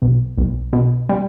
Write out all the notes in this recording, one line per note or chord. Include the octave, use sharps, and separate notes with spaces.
B1
B1
B2
G3